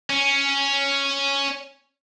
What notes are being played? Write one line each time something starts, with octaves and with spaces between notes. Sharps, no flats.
C#4